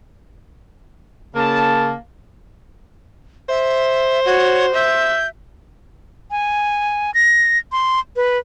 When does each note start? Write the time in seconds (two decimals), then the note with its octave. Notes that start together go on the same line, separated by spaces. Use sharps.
1.35 C#3 A#3 A5
3.49 C5 E5
4.26 F#4 C#5
4.74 E5 G6
6.31 G#5
7.14 A#6
7.72 C6
8.16 B4